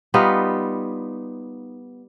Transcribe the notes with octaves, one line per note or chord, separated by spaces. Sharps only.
G3 B3 D#4 F4